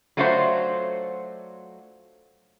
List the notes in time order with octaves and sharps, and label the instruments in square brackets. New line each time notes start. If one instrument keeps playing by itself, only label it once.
[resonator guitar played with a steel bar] F#3 A3 D4 F4 F#4 C5